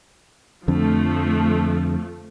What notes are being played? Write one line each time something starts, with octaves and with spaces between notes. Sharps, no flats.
F2 D3 F3 A3